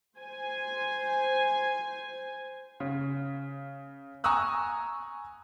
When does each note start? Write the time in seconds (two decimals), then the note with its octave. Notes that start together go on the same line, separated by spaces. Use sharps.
0.17 C5 G#5
2.80 C#3
4.24 G#5 A#5 C#6 D#6 E6 F#6